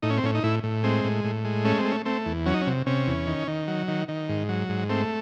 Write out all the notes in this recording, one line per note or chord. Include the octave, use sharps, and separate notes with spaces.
A2 D#4
C#4
C4
A2 C#4
D#4
A2 E4
A2
G#3 C4
A2
A2
G#3
A3 C#4
C4
A3
C#4
A3 C4
E2
F#3 C#4
D#4
C#4
C3
C3 C#4
E2
D#3
D#3
F#3
D#3
D#3
G#2
F#3
G#2
A3 C4